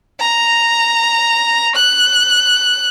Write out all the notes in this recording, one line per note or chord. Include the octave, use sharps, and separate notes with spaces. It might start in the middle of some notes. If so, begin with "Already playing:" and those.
A#5
F#6